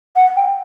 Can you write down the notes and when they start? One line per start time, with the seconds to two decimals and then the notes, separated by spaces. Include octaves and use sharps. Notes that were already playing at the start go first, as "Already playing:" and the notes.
0.16 F#5
0.36 G5